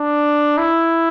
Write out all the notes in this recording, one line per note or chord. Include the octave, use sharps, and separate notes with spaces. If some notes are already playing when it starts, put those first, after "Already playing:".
Already playing: D4
E4